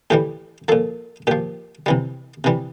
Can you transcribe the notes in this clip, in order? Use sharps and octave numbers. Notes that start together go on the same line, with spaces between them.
A2 E3 G3 G4
A#2 F3 A4
A#2 F3 G4
C3 E3 G3
C3 E3 G3